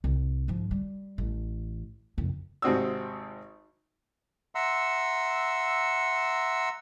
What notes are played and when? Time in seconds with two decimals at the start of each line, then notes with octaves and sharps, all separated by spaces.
0.04 C2
0.48 G#2 F3
0.71 G3
1.18 A1
2.18 F#1 F2
2.62 G#1 C3 C4 F#4 D#6 E6
4.55 E5 F#5 A#5 C6 E6